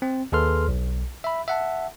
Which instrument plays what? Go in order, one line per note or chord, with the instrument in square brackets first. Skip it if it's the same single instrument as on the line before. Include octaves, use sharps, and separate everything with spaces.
[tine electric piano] C4
D#2 G#4 A4 B4 C6 F6
B1
E5 B5
E5 F#5 A5